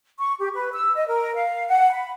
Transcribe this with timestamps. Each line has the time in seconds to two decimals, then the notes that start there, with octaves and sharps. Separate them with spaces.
0.19 C#6
0.39 G4
0.54 B4
0.73 E6
0.95 D#5
1.08 A#4
1.35 F5
1.68 F#5
1.93 B5